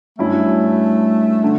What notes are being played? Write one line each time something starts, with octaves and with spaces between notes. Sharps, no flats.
G2 F#3 A3 C#4 E4
D3